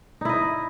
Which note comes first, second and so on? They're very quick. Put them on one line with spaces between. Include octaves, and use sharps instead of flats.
D#4 E4 D#5